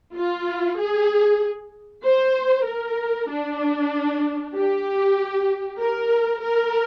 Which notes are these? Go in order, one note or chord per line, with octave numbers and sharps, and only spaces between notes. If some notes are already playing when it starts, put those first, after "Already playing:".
F4
G#4
C5
A#4
D4
G4
A#4
A#4